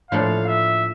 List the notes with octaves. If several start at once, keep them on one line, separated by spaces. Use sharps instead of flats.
A2 F3 A#3 D4 A4 F5
E5